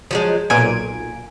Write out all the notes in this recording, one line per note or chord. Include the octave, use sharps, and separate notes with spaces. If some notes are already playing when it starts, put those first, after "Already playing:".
F3 F#3 G#3
B1 A#2 G#5 D7